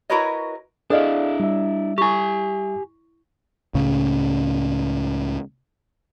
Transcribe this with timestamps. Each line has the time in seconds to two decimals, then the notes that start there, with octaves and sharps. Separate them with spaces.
0.10 E4 F#4 A#4 B4 C#5 D#5
0.90 D4 E4 G#4 A4 D5 D#5 F5
1.40 G3 E5
1.98 E4 G4 G#5 C#6
3.74 C#2 A2 C#3 C#4